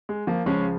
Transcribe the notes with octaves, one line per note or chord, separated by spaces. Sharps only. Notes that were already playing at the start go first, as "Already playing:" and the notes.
G#3
F3 A#3
C#2 C#3 F3 G#3 C#4